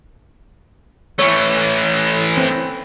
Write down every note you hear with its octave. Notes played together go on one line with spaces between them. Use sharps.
E3 A3 C#5 C#6 F6
C4